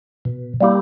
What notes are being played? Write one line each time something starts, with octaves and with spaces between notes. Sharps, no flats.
B2
G3 A#3 E4 G4